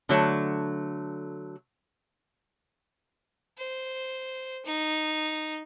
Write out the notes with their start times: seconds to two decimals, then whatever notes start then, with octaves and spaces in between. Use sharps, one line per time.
0.09 D3 F#3 A3
3.58 C5
4.66 D#4